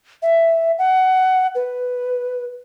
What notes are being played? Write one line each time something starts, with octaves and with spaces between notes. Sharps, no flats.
E5
F#5
B4